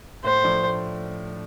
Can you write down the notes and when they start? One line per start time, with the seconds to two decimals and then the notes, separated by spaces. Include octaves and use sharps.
0.24 A2 C5
0.44 F3 A3 D4
0.62 A2